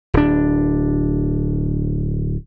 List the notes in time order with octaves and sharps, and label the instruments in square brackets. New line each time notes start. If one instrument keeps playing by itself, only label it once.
[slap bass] D1 D4